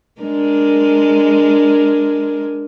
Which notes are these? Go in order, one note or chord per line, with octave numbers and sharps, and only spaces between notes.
G#3 D4 A#4